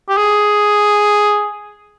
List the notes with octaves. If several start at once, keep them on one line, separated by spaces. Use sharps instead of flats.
G4
G#4